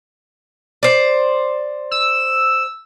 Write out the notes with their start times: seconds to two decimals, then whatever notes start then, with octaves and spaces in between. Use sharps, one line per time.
0.83 C5 D5
1.91 E6